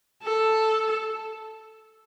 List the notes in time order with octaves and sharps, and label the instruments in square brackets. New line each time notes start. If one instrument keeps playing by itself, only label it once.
[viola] A4